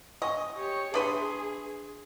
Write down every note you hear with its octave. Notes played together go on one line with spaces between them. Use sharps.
D#5 G#5 C#6
G4 C#5
D4 G#4 B4 E5 C6 D#6